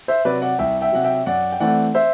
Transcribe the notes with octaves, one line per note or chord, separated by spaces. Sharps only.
C5 E5
C3 F#3 B4 D5
D5 F#5
C2 E5 G5
E5 G5
C3 F#3 F#5
E5 G5
F#2 D5 F#5
G5
E3 A3 C4 D5 F#5
C5 E5